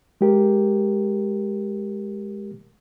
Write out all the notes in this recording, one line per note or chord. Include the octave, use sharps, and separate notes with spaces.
G#3 G4 A#4